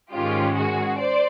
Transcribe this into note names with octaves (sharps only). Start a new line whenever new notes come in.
G#2 D#3 G#3 C#4 F4 G4
F#4 G#4
C5 D5